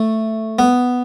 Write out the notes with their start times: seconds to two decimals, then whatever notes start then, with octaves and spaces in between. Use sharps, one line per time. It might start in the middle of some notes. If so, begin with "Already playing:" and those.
Already playing: A3
0.59 B3